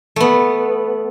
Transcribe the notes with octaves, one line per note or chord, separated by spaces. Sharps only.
A3 B3